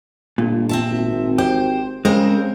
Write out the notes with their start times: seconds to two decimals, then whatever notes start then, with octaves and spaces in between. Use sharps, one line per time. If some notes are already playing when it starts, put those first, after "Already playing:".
0.38 G1 A#2
0.69 C4 E5 A5
0.90 G#1
1.38 G4 C5
2.05 C#3 G#3 C4 A#4 C5